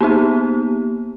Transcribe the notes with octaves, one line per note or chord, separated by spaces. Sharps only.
A#3 B3 D#4 G4